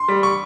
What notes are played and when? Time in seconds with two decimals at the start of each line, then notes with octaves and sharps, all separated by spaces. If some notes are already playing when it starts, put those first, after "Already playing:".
Already playing: C6
0.08 G3
0.23 C#6